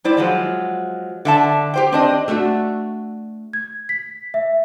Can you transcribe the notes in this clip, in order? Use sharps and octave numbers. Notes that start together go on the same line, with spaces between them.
G3 E4 C5 D5
F3 F#3 G#3
D3 E5 A5
G4 C5 G5
C4 D4 D#5
A3 D4 F#4 E5
G#6
B6
E5